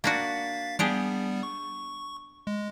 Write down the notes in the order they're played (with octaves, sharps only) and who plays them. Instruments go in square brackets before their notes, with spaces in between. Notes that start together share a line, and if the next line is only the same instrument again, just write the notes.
[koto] A#3 D4 F#4 [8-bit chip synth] F5 A6 B6
[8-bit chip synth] G3 B3 [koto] D4 G4 G#4
[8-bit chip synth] C#6
G#3